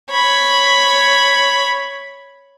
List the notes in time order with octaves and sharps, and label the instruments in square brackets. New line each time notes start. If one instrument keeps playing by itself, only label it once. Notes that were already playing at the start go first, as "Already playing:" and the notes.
[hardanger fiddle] C#5 B5